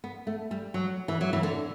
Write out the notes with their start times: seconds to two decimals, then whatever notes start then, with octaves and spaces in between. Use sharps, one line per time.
0.04 B3
0.27 A3
0.51 G3
0.74 F#3
1.08 E3
1.21 F#3
1.33 E3
1.43 D3